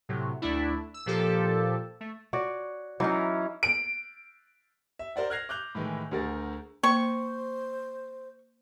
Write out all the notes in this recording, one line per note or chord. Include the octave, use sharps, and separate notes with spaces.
A2 C3 F#3
D2 A3 D4 E4
E6
A#2 F3 G4 A4
A3
F#4 C#5 D5
E3 F#3 C#4 D#4
D7
E5
A#4 C5 D5 F#5
F6 F#6 G#6 A#6 C7 F7
D6 F#6 G6 F7
A2 D#3 E3 G#3
D2 G#4 A#4 F#5 A6
A#3 C5 C#6